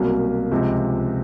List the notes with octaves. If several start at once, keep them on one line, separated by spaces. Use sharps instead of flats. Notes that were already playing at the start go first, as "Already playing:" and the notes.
Already playing: C2 B2 F#3 A#3
C#2 C3 F3